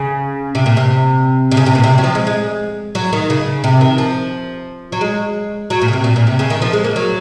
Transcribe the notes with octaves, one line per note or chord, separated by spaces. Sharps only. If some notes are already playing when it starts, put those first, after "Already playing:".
Already playing: C#3
C3
A#2
C3
C3
C#3
C3
A#2
C3
F#3
F3
G#3
G#3
F#3
D#3
C#3
C3
D#3
F3
F#3
G#3
F#3
A#2
C#3
C3
A#2
A#2
C3
C#3
D#3
F3
G#3
A#3
F#3